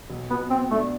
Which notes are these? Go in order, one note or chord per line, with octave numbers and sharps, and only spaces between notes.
B1
B2 B3
B3 C4
A3 D4